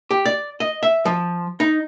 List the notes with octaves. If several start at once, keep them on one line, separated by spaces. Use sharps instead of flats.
G4
D5
D#5
E5
F3
D#4